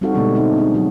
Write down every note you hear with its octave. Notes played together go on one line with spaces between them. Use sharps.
G3 C4 D#4 F#4 A4 F5
B2 D3 G#3 A3 B3 D4
C4 D#4 F#4
C4 D4 G#4
F#3 A3 F#4